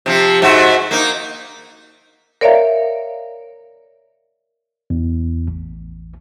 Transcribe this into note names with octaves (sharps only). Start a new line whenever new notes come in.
C3 F3
G#2 F#4 E5
A#3 D#4
A#4 C#5 D5 E5 F5 A#5
E2
A1